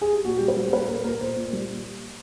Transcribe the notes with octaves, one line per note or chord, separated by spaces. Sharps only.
G#4
G4
A#2 F#4
G3 G4
B4
G3
C5
A#2 B4
A#2 A#4
A#2 A#4
A#2 C5
A#2
G3